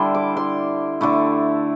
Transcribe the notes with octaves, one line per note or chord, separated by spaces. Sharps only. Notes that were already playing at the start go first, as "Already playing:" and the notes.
Already playing: D3 G3 E4 A5 C6
D6
C6
D3 A3 E4